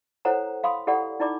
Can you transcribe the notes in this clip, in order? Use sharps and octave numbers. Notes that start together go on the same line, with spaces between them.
E4 A4 C5 C#5 F#5 A#5
F5 B5 C6 D#6
E4 G4 A4 D5 F#5 B5
D#4 E4 D5 B5 D6